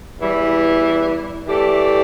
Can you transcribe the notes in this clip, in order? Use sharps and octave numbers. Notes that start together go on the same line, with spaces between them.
E2 E3 G3 E4
E3 A3 G4 D5